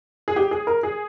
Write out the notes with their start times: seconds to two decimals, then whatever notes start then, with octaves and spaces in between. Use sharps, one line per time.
0.28 G#4
0.36 G4
0.51 G#4
0.67 A#4
0.83 G#4